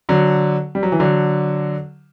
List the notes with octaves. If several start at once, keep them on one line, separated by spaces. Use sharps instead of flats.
D3 F#3
G3
F#3
E3
D3 F#3